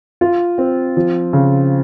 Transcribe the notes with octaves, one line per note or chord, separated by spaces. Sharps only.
F4
C4
F3
C#3